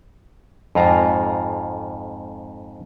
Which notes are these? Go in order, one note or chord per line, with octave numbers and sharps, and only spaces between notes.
F2 G#2 F4 A#5